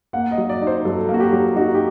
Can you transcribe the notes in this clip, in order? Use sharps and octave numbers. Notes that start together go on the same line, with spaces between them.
A#3 F#5
D#5
F#3
D5
D#4
C5
F#3 A4
A#3
F#4
G4
F#3
D#4 F#4
G4